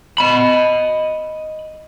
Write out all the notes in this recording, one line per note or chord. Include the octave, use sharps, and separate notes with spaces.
D#5 B5